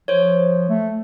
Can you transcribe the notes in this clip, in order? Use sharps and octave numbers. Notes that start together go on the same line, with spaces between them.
F3 C5 C#5
A3